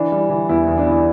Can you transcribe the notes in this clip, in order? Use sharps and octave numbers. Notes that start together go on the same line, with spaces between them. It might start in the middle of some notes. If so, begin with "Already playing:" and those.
Already playing: E3 D4
G3
E3
E2 E4
E2
D4
E3 E4